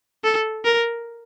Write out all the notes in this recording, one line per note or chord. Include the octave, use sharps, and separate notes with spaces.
A4
A#4